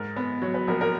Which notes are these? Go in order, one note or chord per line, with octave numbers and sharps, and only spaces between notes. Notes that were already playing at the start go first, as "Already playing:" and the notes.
Already playing: G#2 A#4
B3 B4
F#3 C#5
B4
A#1 A#4
A#4